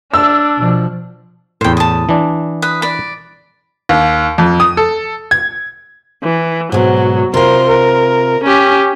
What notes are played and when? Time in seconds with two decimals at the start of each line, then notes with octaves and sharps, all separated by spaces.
0.14 D4 E6
0.58 B2 F3
1.61 E2 A2 C5 G5
1.77 A5 D#6
2.09 E3 D4
2.62 B4 D#6
2.82 D5 B5
3.89 D#2
4.38 F2
4.60 D#6
4.77 A4
5.31 G#6
6.23 E3
6.72 G#2 B2 F#3
7.34 C3 F4 A#4 C6
7.68 A#4
8.44 C#4 G4